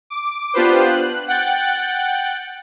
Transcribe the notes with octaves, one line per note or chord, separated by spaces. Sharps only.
D6
B3 D4 F4 G4 B4 C5
F#6
F#5 G5 F#6 A6